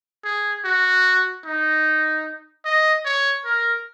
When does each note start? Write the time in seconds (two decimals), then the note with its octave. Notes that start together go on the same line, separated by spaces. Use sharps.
0.25 G#4
0.65 F#4
1.45 D#4
2.65 D#5
3.05 C#5
3.45 A#4